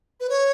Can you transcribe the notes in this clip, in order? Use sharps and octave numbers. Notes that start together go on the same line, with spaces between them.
B4
C#5